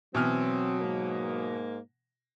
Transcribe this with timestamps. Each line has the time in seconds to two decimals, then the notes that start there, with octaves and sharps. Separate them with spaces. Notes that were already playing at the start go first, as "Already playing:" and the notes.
0.15 B2 E3 F#3 C4 F6
0.81 G#2 A#3